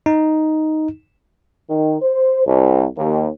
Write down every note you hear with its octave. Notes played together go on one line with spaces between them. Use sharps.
D#4
D#3
C5
C2
D#2